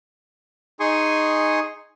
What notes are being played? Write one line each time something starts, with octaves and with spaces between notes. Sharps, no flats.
D#4 G#4 G#5 C6 C#6 D#6